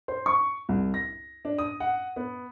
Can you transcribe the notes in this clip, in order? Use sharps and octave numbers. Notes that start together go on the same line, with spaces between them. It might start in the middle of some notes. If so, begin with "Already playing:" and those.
C5
C#6
C2
A#6
D4
D#6
F#5
B3